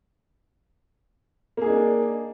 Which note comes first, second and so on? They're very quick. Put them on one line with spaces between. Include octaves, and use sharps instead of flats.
A#3 G#4 D#4 D4